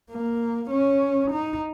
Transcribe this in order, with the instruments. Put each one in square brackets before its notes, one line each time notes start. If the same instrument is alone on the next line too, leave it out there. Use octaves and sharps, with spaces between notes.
[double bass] A#3
C#4
D#4